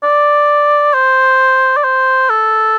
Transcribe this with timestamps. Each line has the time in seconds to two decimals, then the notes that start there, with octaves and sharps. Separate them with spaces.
0.04 D5
0.94 C5
1.77 D5
1.84 C5
2.30 A4